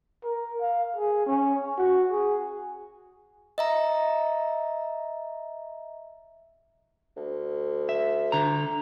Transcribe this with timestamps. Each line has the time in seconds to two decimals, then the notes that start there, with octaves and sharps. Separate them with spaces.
0.24 A#4
0.61 F5
0.96 G#4
1.27 C#4
1.78 F#4
2.11 G#4
3.58 D#5 E5 A#5
7.17 D2
7.89 E5
8.32 D3 A#5